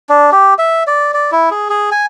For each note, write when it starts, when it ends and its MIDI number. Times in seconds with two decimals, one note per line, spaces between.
0.09 0.30 62
0.32 0.54 67
0.59 0.83 76
0.87 1.11 74
1.14 1.31 74
1.32 1.49 64
1.51 1.68 68
1.70 1.90 68
1.91 2.06 80